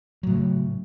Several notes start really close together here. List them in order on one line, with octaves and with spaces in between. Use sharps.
F#3 A2 C#3